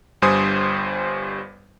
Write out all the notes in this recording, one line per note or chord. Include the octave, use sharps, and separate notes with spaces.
G1 G2 G3 C5 G#5 D#6